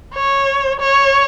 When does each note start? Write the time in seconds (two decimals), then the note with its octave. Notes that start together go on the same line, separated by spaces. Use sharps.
0.15 C#5
0.80 C#5